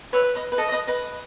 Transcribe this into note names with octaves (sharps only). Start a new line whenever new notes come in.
B4 C#5 E5
B4 D#5
B4
A4 D#5
B4 D#5
B4 D#5